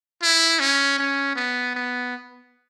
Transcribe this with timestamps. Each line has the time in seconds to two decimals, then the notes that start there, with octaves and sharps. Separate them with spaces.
0.23 E4
0.60 C#4
0.98 C#4
1.36 B3
1.75 B3